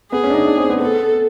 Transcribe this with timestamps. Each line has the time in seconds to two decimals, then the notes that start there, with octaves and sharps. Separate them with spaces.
0.11 B3 G#4
0.24 C#4
0.30 D4
0.34 D#4
0.46 D4
0.58 C4
0.70 B3
0.81 B3 A4